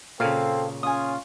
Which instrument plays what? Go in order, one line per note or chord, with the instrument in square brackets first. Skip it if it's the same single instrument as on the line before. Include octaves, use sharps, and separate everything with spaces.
[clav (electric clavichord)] A#2 C#3 [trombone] C4 [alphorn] A4 [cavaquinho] F5
[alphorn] C#4 [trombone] F4 [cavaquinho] G#5 D#6